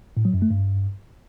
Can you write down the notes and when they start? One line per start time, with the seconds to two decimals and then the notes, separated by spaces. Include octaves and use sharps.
0.17 A2
0.25 F#3
0.34 F#2
0.42 A3
0.50 G2